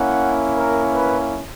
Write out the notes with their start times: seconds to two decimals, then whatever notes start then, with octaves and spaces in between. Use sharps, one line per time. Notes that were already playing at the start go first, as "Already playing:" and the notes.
Already playing: A#3 C#4 E4 F#5
0.57 A#4
0.93 B4